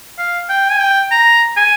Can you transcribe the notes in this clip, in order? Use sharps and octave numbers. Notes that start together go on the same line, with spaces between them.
F5
G5
G#5
G5
A#5
G#5